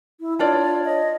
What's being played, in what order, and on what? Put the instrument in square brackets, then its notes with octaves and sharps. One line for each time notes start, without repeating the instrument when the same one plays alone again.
[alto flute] E4
[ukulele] D4 F4 D5 [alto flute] C#5
[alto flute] D#5